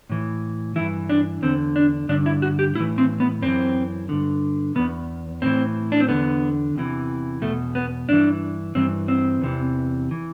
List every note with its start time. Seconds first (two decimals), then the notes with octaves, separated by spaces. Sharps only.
0.10 A2 E3
0.76 G2 E3 E4
1.09 D4
1.42 E2 D3 C4
1.76 D4
2.09 G2 D3 D4
2.26 E4
2.42 F#4
2.59 G4
2.75 A2 E3 E4
2.98 C4
3.20 B3
3.42 F#2 E3 C4
4.09 G2 D3
4.75 E2 B2 B3
5.42 A2 E3 C4
5.92 D4
6.00 C4
6.09 E2 D3 B3
6.76 E2 C3 E3
7.42 E2 B2 A3
7.75 B3
8.09 G2 E3 D4
8.75 G2 E3 C4
9.08 C4
9.41 E2 C3 E3
10.11 E3